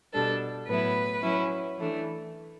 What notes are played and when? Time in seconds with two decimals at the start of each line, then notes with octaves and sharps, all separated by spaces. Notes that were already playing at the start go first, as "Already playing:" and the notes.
0.13 B2 G3 D4 A4
0.68 A2 F#3 B3 E4 B4
1.22 F#3 C#4 E4
1.78 E3 A3 D4